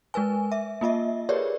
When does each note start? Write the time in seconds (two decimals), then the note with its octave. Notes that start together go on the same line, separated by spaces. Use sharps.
0.14 G#3 A#4 B4 G#5
0.52 E5
0.81 A#3 F4 D#5 E5
1.29 G4 G#4 A#4 B4 C#5 D5